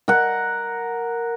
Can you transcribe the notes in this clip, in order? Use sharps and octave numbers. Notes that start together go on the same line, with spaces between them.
A#4 F#5